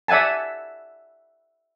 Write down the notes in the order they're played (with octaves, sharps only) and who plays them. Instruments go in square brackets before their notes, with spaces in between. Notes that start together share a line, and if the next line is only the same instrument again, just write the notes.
[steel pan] D5 E5 F#5 G#5 A5